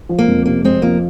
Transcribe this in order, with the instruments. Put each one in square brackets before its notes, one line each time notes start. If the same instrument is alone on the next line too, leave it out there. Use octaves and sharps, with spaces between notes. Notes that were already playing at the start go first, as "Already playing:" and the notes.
[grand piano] F3
[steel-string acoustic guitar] A#3
[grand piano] F2
[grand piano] C3 [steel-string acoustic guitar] A#3
[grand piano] F2 [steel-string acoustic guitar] G#3 C4
[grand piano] F3 [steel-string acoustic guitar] A#3